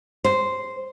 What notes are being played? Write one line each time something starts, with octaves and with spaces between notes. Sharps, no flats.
C5